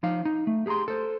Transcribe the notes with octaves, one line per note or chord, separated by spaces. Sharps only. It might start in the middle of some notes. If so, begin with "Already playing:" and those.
F3 D#4 F5
D#4
A3
G4 G#4 A5 A#5 C6
A4 C5